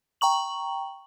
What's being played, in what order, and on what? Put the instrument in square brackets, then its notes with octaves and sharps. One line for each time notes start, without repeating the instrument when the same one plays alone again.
[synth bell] G5 A#5 C#6 F#7